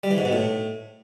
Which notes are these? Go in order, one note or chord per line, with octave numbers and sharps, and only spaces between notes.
G3
E3
G#2
B2
A2